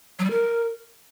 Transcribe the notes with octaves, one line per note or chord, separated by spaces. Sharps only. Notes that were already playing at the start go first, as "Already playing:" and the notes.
F#3
G3
A#4